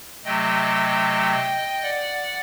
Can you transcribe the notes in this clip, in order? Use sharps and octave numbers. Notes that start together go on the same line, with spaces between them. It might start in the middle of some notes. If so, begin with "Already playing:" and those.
C3 F#3 A3 D#5 G5
D5 F#5